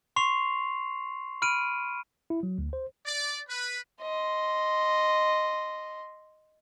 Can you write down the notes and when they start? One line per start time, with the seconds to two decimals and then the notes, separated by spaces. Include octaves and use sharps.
0.16 C6 C#6 C7 F7
1.42 B5 F6 D7 D#7
2.30 E4
2.43 F#3
2.58 D2
2.73 C5
3.06 D5
3.49 B4
4.02 D#5 C6